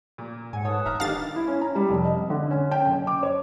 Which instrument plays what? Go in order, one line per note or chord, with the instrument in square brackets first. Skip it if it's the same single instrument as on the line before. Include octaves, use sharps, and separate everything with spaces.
[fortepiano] A#2
[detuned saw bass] G#2 [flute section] C#5 F#5 [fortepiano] G#5
[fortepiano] A4 C#5 [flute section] B4 A5 D#6
[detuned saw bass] D#1 [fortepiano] E5 A#5 F6
[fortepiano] D3 D#3 G4 [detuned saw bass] D#4 [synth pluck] F5 A6
[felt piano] E4
C#4
A#5
G3
F1
D#5
D3
C#4
G5
F#1
D6
C#5